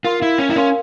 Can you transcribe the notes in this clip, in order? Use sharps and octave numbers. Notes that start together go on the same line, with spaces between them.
F4 A#4 F5 C6
E4
C#4
E4
C#4 A#4 F5 C6